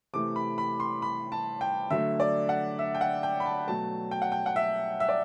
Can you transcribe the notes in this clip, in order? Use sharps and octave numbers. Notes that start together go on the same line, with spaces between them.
C3 E3 A3 D6
B5
B5
C6
B5
A5
G5
D3 F#3 A3 E5
D5
F#5
E5
G5
F#5
G5
B5
A5
B2 F#3 A3 A5
G5
F#5
G5
F#5
E5
E5
D5